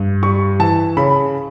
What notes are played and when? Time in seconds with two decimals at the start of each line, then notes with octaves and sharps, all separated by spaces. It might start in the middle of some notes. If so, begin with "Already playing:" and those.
Already playing: G2
0.23 G3 C#6
0.59 E3 A5
0.97 C#3 B5